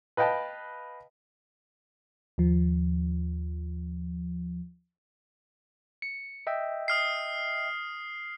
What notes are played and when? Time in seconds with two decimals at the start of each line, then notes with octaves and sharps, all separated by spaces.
0.17 B4 D#5 F5 G5 A5 B5
2.38 D#2 F3
6.02 C#7
6.47 D#5 E5 G5
6.88 D#6 F6 C7